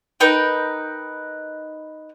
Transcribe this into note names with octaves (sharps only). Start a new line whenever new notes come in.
D#4 A#4 B4 G5